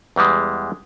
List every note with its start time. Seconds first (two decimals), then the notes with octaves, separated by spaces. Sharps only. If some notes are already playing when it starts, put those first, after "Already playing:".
0.16 E2 E3 G3 G#3